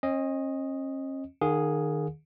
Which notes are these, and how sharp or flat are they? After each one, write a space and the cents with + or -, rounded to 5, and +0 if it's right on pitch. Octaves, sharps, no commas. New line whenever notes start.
C#4 -45 D#5 +0
D#3 -25 G#4 +0 F5 +35